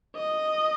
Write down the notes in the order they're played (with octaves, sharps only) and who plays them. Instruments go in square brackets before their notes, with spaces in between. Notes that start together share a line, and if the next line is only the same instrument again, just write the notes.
[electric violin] D#5